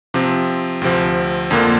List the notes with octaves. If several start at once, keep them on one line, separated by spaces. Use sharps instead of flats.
C3 F3 C4
D2 C3 F3
F2 D3 A#3 F4